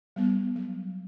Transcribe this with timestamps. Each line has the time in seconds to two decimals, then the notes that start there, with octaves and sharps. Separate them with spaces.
0.16 G3 B3
0.56 F#3